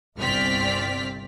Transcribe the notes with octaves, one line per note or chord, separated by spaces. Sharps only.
G1 C2 C4 D5 F6 B6